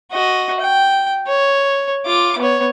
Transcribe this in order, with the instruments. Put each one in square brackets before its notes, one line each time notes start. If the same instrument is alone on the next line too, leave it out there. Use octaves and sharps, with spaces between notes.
[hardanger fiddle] F#4 D#5
G5
C#5
F4 D6
B3 C#5